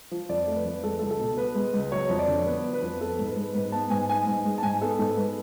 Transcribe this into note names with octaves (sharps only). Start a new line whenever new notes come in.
F3
F2 D5
A3
B4
F2
G#3 A4
C#2 A4
A4
B2
B3 B4
G#3
C#2
F#3 C#5
F2
D5
D3
B3 B4
F#3
B4
F2
B3 A4
G#2
B4
G#3
G#2 B4
B3 A5
G#2 G#5
B3 G#5
G#2
G#3
A5
G#2 G#5
B3 A4
G#2 A4
G#3 B4